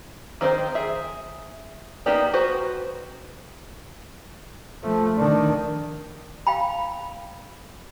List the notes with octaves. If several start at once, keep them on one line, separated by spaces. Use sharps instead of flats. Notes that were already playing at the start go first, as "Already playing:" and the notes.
D#3 C4 D4 D#4 C5
G#4 E5
A#3 B3 D#4 G4 D5
F#4 B4 C5
F3 A3
D#3 D4
F5 G5 B5